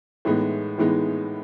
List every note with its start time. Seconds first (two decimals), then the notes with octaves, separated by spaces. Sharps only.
0.25 A2 E3 G#3 B3 D#4
0.78 A2 E3 G#3 B3 D#4